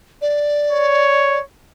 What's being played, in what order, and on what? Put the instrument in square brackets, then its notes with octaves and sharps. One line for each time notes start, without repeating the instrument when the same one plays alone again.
[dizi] D5
[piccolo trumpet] C#5